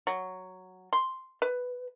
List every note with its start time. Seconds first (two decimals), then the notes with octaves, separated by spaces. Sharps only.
0.07 F#3
0.93 C6
1.42 B4